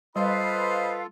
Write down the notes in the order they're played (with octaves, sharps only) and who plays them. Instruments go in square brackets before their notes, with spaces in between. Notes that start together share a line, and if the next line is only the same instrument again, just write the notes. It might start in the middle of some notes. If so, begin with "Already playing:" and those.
[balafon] G3 [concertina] F4 A4 [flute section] B4 F5 [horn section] C5 D#5 B5